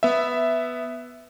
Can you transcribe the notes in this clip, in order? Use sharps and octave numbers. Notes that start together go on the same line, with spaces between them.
B3 E5